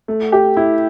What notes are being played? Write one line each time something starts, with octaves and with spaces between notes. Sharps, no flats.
A3
G4
E4